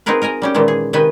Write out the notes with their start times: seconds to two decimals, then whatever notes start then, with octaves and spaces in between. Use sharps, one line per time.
0.06 C4 D#4 F#4 G#4 A#4 B4
0.22 A#4 D#5 G#5 A#5
0.42 G3 C#4 G4
0.54 A#2 D#3 E3 G#3 A#3
0.68 G#4
0.93 C3 D#3 B4 D#5 G5 G#5